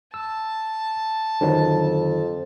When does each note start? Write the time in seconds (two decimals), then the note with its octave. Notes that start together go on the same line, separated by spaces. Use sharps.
0.14 A5 E6
1.41 F2 D3 D#3 F#3